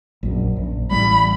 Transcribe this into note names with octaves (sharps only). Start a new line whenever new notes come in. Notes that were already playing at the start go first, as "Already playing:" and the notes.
A#1 F#2
A#1
A1 G3 B5